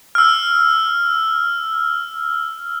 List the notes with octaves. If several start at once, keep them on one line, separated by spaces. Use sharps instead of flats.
E6 F6